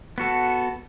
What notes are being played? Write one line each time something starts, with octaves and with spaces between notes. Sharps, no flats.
B3 F#4 A4